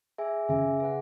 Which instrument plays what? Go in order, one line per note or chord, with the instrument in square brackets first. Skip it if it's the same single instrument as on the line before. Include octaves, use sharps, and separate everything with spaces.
[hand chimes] G#4 E5 G#5
[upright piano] C#3 [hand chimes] G#4 E5 G#5
[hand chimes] G#4 B4 F#5